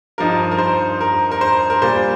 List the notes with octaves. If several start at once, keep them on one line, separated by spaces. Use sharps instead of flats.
G2 F3 D#4 A#4
A#4
C5
A#4
A#4
C5
A#4
A#2 G3 A#3 C5